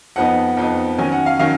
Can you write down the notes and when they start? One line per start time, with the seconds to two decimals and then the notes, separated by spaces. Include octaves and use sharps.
0.16 F2 F3 B3 D#4 F#5
0.57 F2 F3 B3 D#4
0.98 D#3 F#3 C#4 G#5
1.12 F#5
1.26 F5
1.39 D#3 F#3 C#4 F5